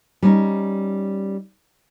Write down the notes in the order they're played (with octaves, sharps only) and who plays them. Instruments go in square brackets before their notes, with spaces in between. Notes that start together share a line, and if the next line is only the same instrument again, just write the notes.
[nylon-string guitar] G3 C#4 D#4